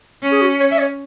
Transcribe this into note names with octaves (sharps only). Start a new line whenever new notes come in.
C#4
G#4
F#4
C#5
E5
C#5